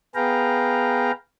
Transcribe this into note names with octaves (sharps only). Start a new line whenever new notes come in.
B3 G#4 B4 F5 G5 A#5